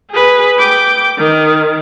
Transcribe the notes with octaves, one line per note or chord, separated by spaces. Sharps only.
G#4 B4
G5 D6
D#3